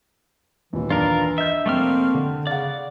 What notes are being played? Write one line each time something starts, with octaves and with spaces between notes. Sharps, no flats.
D#2 A#2 E3
D4 F4 A#4
D#5 E5 G6
F1 A3 A#3 C4 F6
D3
C#3 D5 F5 F#5